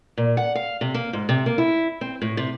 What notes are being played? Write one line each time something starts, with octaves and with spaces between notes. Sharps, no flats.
A#2
F#5
F5
C3
A#3
G#2
C3
A#3
E4
C4
A2
C3